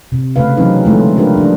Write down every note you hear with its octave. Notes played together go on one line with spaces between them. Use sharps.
C3
C#3 A3 B4 F5
E3 F#3 C4 C#4 D#4 B4
D3 F3 G#3 A3 E4 F4
D4 F4 G4 A#4 B4
F3 D4 G#4